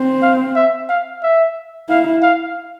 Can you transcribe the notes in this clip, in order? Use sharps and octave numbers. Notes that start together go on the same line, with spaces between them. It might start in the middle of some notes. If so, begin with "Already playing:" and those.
Already playing: C4
F5
E5
F5
E5
E4 F5
F5